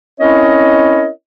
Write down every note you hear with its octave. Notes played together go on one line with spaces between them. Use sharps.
C4 C#4 E4 A#4 C#5 D#5